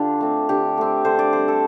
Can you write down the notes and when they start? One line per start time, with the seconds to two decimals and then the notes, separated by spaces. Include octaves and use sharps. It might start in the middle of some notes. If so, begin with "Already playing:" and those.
Already playing: D3 D4 F4 G4 A4
0.21 A3 C4
0.49 D3 G4
0.77 A3 C4
1.05 D3 C5
1.19 D5
1.33 G3 C4 C5
1.48 A4